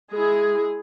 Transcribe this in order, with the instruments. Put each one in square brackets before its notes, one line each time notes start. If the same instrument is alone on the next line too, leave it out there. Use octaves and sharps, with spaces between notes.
[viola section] G#3 E4 G#4